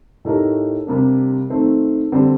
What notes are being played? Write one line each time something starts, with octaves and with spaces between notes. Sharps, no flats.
A2 A3 D#4 G4 A#4
C3 G3 A#3 D4
D#3 A3 C4
D3 G3 C4